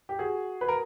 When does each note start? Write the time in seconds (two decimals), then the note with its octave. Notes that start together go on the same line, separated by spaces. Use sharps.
0.09 G4
0.19 F#4 G#4
0.61 B4
0.68 A#4